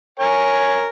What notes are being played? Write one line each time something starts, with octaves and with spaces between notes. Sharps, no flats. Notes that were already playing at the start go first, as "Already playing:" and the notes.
A#4 C#5 G#5